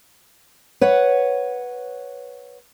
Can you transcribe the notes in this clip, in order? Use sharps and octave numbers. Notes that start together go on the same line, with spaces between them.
B4 C#5 F#5